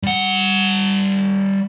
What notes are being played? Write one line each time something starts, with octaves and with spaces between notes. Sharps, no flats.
G3 F#5